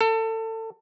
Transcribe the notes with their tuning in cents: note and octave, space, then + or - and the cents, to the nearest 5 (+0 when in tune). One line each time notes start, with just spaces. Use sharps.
A4 +25